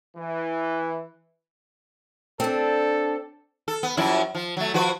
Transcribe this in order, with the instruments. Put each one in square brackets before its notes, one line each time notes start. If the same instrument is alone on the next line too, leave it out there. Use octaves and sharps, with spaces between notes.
[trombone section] E3
[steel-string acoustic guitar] C4 D4 [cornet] A4
[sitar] A4
B3
F#2 F3 E4
F3
F#3 A3
F3 F#4 B4